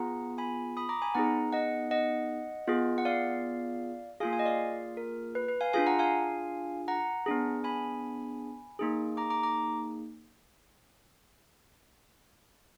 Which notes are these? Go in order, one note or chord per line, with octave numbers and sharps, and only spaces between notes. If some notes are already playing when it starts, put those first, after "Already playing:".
Already playing: B3 F4 G#4 F#5 A#5
G#5 B5
B5 D#6
A#5 D6
G#5 B5
B3 D#4 G#4 F#5 A#5
D#5 F#5
D#5 F#5
B3 F4 G#4
F#5
D5 F5
A#3 F4 G#4 F5 G#5
F5 G#5
D#5
D5 F5
A#4
B4
B4
F5 G#5
D4 F4 G#4 F5 G#5
F#5 A#5
F5 G#5
F#5 A#5
B3 D4 G#4
G#5 B5
A#3 D#4 G#4
A#5 D6
A#5 D6
A#5 D6